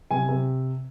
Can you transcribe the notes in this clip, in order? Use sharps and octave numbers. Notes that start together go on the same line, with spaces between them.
C3 G#5
C3